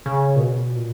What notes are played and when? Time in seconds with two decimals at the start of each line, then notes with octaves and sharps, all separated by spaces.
0.06 C#3
0.36 A#2
0.40 B2
0.75 A#2